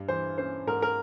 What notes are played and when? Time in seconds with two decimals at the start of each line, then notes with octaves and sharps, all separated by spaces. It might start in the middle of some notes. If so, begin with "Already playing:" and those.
Already playing: G2
0.08 E3 C5
0.38 C#4 C5
0.67 G#2 A#4
0.82 A#4